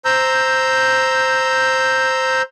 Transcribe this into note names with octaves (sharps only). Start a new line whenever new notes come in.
C5 A#5 E6 G6